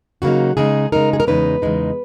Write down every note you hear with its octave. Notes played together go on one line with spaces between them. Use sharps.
C#3 F#3 A#3 D#4 F#4
C#3 G#3 D#4 G#4
C#3 G#3 D#4 A#4
G#4
A#4
E2 C#3 G#3 D#4 B4
E2 C#3 G#3 D#4